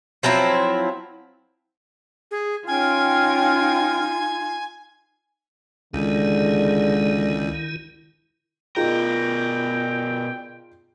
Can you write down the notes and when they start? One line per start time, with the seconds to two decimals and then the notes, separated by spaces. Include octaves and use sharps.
0.23 F3 F#3 C4 E4
2.31 G#4
2.67 C#4 D#4 F4 G5 G#5 F6
5.94 C#2 D3 D#3 G#3 E4
8.76 B2 D#4 F4 G#4 A#4 G5